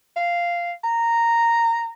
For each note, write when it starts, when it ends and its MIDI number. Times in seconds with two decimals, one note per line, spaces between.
0.16 0.72 77
0.84 1.92 82